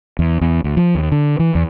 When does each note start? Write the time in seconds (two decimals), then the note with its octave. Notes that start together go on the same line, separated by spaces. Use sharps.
0.19 E2
0.41 E2
0.64 D2
0.77 F3
0.95 D#2
1.12 D3
1.39 E3
1.55 E2